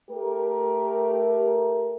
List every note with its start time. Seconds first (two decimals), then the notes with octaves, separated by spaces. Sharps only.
0.10 A3 G4 A#4